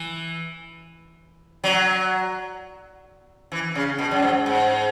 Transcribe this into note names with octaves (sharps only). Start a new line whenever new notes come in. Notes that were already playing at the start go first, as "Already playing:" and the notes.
Already playing: E3
F#3
E3
C#3
B2
F#2
G#2
G#2